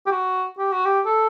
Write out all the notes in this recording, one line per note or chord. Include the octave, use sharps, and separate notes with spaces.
G4
F#4
G4
F#4
G4
A4